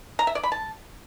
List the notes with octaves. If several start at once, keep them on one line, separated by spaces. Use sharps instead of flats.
A#5
E5
D5
B5
A5